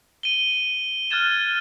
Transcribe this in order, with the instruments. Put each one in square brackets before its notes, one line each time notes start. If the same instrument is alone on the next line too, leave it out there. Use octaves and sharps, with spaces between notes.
[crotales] D#7 G7
F6 F#6 G#6 A6 E7